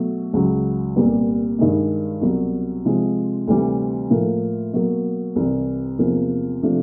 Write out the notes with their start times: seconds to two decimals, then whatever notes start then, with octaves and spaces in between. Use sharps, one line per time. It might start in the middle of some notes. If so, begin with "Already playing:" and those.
Already playing: B2 F#3 A3
0.33 C#2 C#3 F#3
0.96 C2 A#2 G3 B3
1.59 G2 D#3 G#3
2.21 C2 B2 F#3
2.85 C3 F3 G#3
3.47 D2 C3 E3 G3
4.10 A2 F3 A#3
4.73 B2 F#3 A#3
5.36 C2 C3 E3
5.99 E2 C3 F3 A#3
6.62 C3 F3 A3 D4